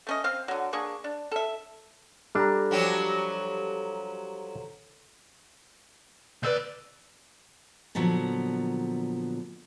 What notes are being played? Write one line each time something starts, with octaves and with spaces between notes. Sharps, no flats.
A3 C#4 D#5
C4 F5
D3 F#3
A#3 D4 G#4 C#6
D4
A4 E5
G3 D4 A4 A#5
F3 F#3 G4
D2 B4 D5 E6 G6
A#2 D3 F3 F#3 B3